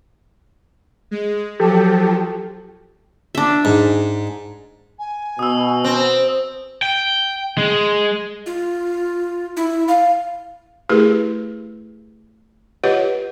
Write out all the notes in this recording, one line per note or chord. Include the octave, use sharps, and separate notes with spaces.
G#3
F3 F#3 G4 A4
D4 E5
G#2
G#5
B2 D#6 E6
C4
G5
G#3
F4
E4
F5
A3 E4 G4 G#4 A#4 B4
F4 G4 B4 C#5 D#5 F#5